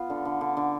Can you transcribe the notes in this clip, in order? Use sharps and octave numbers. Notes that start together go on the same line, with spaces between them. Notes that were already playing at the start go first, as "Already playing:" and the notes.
Already playing: B3 F4
D3
D3
D3
D3